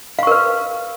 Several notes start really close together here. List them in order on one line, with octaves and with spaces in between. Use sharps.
F5 C#6 A#4 B4